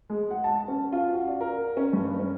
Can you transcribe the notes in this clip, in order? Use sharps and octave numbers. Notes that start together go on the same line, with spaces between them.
G#3
F#5
A5
C#4
F4
F#4
D5
A#4
C#4
G2
C#4